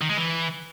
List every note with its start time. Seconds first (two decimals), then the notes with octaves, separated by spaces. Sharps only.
0.01 D#3
0.09 G#3
0.17 E3